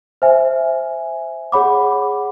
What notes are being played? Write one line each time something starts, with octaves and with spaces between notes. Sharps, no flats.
C5 E5 G#5
G#4 C#5 F#5 B5 D6